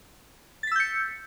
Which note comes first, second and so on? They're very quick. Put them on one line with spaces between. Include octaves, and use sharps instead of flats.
A6 B6 E6 G6 C#7